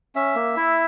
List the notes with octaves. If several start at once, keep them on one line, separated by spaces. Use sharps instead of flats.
C#4 E5
A#3
E4